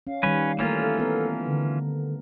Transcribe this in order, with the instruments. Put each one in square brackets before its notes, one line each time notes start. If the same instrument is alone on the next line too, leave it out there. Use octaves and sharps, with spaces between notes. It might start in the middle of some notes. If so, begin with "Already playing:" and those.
[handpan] C#4 [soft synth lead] F5
[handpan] D#3 G3 [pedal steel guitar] C#4 B4
[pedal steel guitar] E3 C#4 F4 [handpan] A3 A#3 A#4
[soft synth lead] A4
[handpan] B3 A#4
[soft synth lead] D3